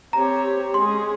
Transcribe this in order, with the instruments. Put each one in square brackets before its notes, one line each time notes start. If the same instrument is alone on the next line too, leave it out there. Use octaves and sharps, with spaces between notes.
[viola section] C4 G4 C#5 [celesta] A#5
[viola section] G#3 C#4 G#4 [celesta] C6